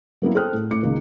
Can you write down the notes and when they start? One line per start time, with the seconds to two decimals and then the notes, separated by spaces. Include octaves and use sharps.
0.22 F#3 A#3 B3 E4
0.35 A4 C5 G5 D#6 F6 F#6
0.53 A2
0.71 A2 D6 C#7
0.83 C#2 D#3 A#3